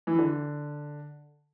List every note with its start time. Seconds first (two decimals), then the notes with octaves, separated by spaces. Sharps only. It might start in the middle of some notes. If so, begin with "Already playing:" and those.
0.07 E3
0.18 D3